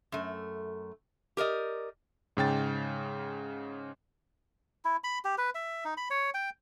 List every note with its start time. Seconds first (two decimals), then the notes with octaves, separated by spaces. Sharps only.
0.12 F#2 A3
1.37 G4 A#4 D5 D#5
2.37 G#2 C#3 G5 A6
4.85 E4
5.04 B5
5.25 G4
5.38 B4
5.55 E5
5.85 D#4
5.97 B5
6.10 C#5
6.34 G5